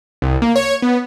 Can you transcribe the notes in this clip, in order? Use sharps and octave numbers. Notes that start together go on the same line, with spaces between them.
C2
A#3
C#5
B3